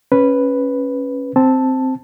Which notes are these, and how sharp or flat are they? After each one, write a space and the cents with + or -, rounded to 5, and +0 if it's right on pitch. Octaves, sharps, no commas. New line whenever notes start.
C#4 -10 B4 +0
C4 +0 A5 +0